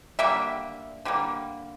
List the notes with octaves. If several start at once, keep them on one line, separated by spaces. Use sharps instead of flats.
D3 G3 A#3 E5
D3 G3 A#3